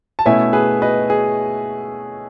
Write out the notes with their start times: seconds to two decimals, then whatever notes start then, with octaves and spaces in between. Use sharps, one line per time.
0.19 A5
0.26 B2 A3 C#4 E4 E5 G#5
0.53 G#4 B4
0.82 B4 D#5
1.10 G#4